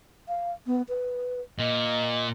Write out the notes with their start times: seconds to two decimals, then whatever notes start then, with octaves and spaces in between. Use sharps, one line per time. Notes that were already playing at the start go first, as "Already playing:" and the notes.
0.28 F5
0.67 B3
0.89 B4
1.59 A#2 D#5